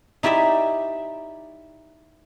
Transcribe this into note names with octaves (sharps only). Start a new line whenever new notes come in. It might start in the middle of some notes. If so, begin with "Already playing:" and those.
D#4 E4 G4 D5 E5